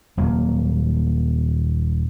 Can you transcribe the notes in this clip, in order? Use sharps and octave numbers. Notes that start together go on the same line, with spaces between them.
D#1 F#3 A#3